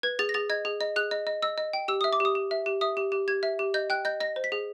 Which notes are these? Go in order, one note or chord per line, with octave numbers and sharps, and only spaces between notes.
B4 G#6
G#4 A6
A#6
G#4 A6
D#5 G#6
G#4
D#5
G#4 F#6
D#5
D#5
D#5 E6
D#5
G5
G4 E6
E5 D#6
D6
G4 D#6
G4
E5
G4
E5 D#6
G4
G4
G4 G#6
E5
G4
D#5 G6
G5 F#6
D#5 G6
D#5 A#6
C5
B6
G#4